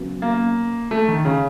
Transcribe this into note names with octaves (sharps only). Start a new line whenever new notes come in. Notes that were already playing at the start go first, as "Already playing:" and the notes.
Already playing: C#3 F#3 B3
A#3
A3
D#3
C#3